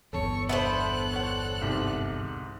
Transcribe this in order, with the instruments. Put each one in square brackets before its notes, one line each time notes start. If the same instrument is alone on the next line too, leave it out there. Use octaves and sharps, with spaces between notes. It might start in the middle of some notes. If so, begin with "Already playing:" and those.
[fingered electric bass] G1 E2 [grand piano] A4 [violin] C#5 C#6
[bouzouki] B3 D4 C5 [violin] A4 F#6 [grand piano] E5
[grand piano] C#5 F#5
C2 G#2 G4